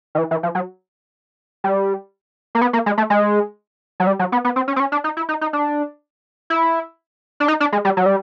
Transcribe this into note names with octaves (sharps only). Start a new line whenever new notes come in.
D#3
E3
E3
F3
F#3
G3
A#3
B3
A#3
G#3
A3
G#3
F#3
G3
F#3
B3
B3
C4
C#4
C4
C#4
D4
D#4
E4
D#4
D#4
D4
E4
D4
D#4
D4
G#3
G3
F#3
G3